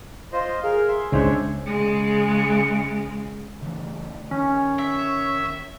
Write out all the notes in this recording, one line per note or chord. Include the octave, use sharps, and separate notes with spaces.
F4 C5 D#5
G#4 A#4 F5
E5 C6
C#2 C#3 G#3 C#4 D4 C5 C#5 E5
C#3 G#3
C#3 E3 A3
D#3 C#4 C#5
E5